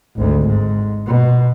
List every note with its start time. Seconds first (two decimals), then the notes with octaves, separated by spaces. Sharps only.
0.16 G#1 D2
0.47 G#2
1.07 B2